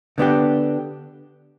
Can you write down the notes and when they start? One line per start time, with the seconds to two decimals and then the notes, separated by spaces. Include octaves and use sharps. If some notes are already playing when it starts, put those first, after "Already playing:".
0.18 D3 B3 D4 G4